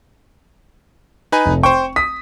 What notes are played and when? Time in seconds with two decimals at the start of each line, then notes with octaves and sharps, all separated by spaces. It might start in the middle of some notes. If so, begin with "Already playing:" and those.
1.32 D#4 B4 G#5
1.46 F1
1.63 C5 G5 C#6
1.96 D#6 B6